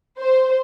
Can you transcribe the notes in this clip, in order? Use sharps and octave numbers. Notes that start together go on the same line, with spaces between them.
C5